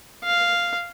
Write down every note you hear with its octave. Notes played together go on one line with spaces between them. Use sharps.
F5